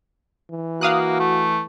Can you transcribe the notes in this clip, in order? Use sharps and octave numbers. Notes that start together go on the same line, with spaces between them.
E3
A#3 F#4 F5 D#6 F#6
A3